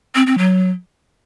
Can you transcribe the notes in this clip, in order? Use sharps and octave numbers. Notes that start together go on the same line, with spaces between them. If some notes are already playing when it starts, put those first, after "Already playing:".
C4
C4
F#3